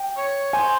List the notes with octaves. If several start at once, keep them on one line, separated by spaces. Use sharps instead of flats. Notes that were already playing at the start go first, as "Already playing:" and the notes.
Already playing: G5
C#5
C5 G#5